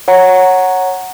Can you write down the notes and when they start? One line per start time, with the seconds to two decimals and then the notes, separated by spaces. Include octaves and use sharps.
0.08 C#5 F#5 A#5